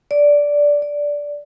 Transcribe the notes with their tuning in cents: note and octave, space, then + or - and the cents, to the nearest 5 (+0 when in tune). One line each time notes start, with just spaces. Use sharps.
D5 -10
D5 -10